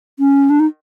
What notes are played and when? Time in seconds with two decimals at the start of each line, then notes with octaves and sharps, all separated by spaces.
0.19 C#4
0.50 D4
0.60 D#4